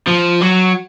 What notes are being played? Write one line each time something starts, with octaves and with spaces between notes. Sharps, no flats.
F3
F#3